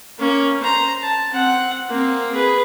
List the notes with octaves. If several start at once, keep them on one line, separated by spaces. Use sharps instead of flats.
A#3 C#4
C5 A#5
A5
C4 F#5
A#3 C4
G#4 B4